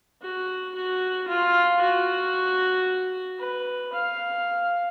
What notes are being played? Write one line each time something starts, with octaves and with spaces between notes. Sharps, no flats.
F#4
F#4
F4
F#4
B4
F5